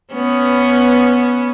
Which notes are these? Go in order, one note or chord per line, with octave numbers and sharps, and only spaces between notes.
B3 C#4